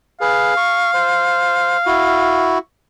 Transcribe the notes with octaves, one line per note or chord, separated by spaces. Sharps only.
G#4 B4 F5
C#6
C5
E4 F#4